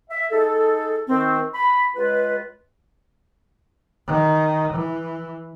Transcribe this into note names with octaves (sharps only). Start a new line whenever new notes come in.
E5
D#4 G#4 A4
D#3 C4
B5
C#2 G#3 F4 B4
D#3
E3